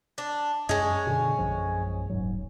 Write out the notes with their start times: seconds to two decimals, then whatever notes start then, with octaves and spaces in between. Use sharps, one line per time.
0.18 D4
0.69 F#2 G#3 C#4
1.07 B2 D3
1.39 A#1 F#2 F3
2.09 D#1 G#2 F#3